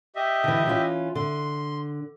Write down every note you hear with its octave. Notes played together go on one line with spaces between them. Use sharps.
G4 D#5 E5
D3 E3
E3 C#4 F4
D3 C6